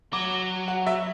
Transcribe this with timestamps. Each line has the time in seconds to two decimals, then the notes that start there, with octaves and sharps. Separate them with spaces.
0.13 F#3 D6
0.68 F#5
0.87 E5